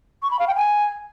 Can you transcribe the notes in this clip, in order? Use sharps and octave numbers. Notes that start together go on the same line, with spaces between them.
C#6
B5
F5
G5
G#5